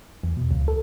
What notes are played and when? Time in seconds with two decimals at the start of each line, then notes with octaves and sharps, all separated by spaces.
0.23 E2
0.37 B2
0.51 C#2
0.68 A4